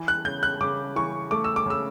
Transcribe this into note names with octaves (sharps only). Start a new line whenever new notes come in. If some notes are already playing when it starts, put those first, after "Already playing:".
Already playing: E3
F#6
C#3 G6
F#6
C#3 D6
E3 C#6
A3 D6
E6
D6
C#3 E6